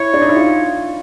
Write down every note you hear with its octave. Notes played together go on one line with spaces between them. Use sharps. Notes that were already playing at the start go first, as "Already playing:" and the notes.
Already playing: E4 C#5
D4
D#4
E4
F4